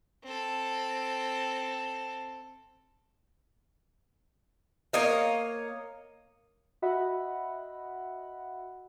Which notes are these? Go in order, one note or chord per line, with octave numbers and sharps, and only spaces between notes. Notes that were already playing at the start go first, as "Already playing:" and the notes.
C4 A4
A#3 C#5 D#5 F5
F#4 D#5 E5 F#5 B5